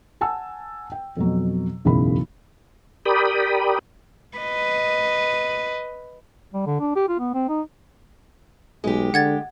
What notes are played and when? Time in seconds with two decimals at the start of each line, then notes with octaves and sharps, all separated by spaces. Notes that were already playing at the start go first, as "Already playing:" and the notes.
0.21 F#5 G#5 A5 E6
0.92 G5
1.17 F2 B2 F#3
1.85 E1 B1 F#2 C#3 E3 B5
3.05 G4 A#4 D5 G5 B5 D#6
4.38 B4 D#5
6.54 G3
6.67 D3
6.80 D4
6.96 G4
7.08 F4
7.20 B3
7.34 C4
7.49 D#4
8.84 B1 G#3 G4
9.14 D3 F#5 G#6 A6